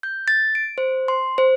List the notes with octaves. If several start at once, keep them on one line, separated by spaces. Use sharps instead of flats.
G6
A6
D7
C5
C6
C5